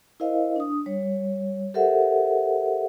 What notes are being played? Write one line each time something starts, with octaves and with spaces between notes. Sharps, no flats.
E4 A#4 C5 D#5 F5
D4 D#6
G3 C#5
G4 A4 A#4 C5 E5 F#5